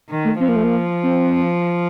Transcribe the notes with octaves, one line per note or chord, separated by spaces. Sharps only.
D#3
A3
F3 C4
A#3
A3
A#3
C4